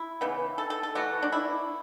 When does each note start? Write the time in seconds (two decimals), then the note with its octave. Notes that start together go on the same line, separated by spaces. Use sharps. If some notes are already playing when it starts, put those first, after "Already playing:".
Already playing: E4
0.21 C#3 E3 B3
0.58 A4
0.70 A4
0.83 A4
0.95 E3 A3 F#4
1.22 D4
1.32 E4